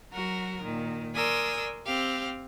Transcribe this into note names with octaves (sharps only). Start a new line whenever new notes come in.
F#3 F#4 A#4
A#2 D#3
A#4 D5 G#5 C6 D#6 E6
C4 G4 F5